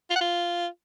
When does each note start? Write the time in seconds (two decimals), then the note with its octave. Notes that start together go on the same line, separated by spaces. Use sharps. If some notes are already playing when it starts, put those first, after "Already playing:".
0.10 F4
0.16 F#5
0.21 F4